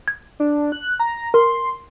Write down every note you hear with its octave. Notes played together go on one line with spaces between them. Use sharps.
G#6
D4
F#6
A#5
A#4 C6